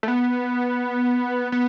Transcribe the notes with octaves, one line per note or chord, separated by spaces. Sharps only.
A3
B3
B3